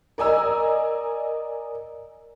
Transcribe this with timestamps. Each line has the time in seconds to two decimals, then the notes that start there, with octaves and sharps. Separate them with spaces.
0.18 A#4 D5 D#5 G#5 A#5 E6